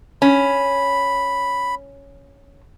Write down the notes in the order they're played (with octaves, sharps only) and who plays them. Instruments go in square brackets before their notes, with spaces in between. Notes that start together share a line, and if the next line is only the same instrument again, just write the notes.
[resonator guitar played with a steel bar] C#4 [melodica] B5